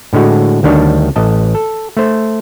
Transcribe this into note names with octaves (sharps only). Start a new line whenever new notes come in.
A2 D3 G#3 F#4
D2 D#3 G3 D4 C#5
A1 D#5 A5
A4
A3 C5